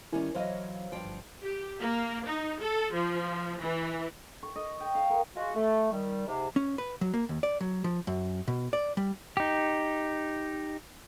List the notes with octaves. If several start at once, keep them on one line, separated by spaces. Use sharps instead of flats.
D#3 G3 C#4 E4 A#4 G#5
E3 F#3 C5 C#5 D#5 F5
G2 F3 G5
G1
G4
A#3
D#4
A4
F3
E3
C#6
D#5
G5
F5
A#4
G#3 F4 F#4
A3
D#3 G3
G#2 C3
C#4
B4
F#3
A#3
D#2
D5
F#3
F3
F#2
B2
D5
G3
D#4 G4